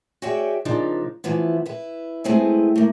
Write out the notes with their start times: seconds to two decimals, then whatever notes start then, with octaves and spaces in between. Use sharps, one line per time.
0.22 F#4 G#4 C#5 D5 E5 G5
0.65 C#3 F3 A#3 D4 D#4
1.24 E3 F3 B3 E4
1.66 E4 B4
2.24 G#3 A3 B3 C4 E4 G#4
2.76 A3 A#3